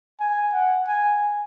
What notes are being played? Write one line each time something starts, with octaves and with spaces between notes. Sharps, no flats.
G#5
F#5
G#5